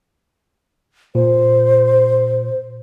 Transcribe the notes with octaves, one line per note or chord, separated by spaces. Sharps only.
A#2 C5